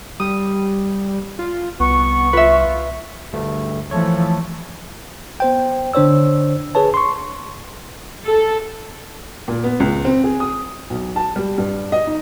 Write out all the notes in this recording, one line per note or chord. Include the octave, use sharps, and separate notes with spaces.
G3 D#6
F4
C2 B3 C#6
F4 B4 E5
D2 G2 A3
E3 F3 A3 C#5
B3 C5 G5
D3 D4 C5 C#5 E6
G#4 B4 C#5 A5
C6 C#6
A4
A#2
B3
C#2
C4
G#4
D#6
B1
A5
G3
G2
D#5
D#4